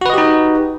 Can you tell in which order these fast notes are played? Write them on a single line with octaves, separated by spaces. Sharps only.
F#4 B4 D#5 G4 D#4